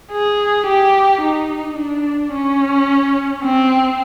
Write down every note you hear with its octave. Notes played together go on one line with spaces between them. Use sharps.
G#4
G4
D#4
D4
C#4
C4